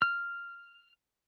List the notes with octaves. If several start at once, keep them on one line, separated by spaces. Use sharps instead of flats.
F6